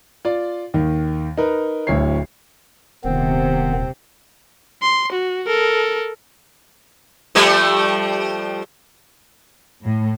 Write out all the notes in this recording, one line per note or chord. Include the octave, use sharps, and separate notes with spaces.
F4 D5
D#2 D#3
D#4 A#4 B4
D1 D2 C#5 C7
D#1 C3 D#3 B3 C4
C6
F#4
A4 A#4
F3 G3 A3
A2